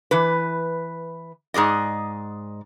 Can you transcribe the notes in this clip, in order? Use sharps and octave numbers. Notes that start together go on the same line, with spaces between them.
E3 B4
G#2 G#4 D5 D#5